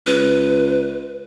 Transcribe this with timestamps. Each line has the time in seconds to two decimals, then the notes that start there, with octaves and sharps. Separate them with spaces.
0.07 C#2 B4